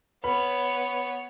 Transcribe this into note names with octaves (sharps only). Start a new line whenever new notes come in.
B3 B4 C#5 B5